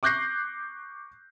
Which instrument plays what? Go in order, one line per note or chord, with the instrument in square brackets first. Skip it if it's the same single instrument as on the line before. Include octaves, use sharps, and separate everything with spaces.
[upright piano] C#6 D6 F#6 G6 A#6 C7